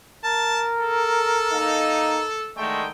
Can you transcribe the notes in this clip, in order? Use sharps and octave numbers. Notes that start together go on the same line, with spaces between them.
A#4 A5
A4
A#3 D#4
D3 D#3 G#3 A3 G5